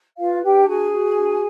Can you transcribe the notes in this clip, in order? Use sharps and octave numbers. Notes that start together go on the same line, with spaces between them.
F4 B4 F5
D4 G4 G5
F#4 G#4 G#5
F#4
D4